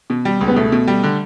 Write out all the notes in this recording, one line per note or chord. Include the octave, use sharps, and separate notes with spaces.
B2
G3
C#2
B3
B2 A3
B2
G3
D3